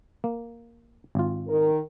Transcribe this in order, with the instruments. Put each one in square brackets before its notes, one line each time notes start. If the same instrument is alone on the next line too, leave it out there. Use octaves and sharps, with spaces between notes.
[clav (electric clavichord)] A#3
G#1 F4
[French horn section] D#3 A#4